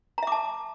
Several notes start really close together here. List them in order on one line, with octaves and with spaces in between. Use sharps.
A#5 E5 D6 A5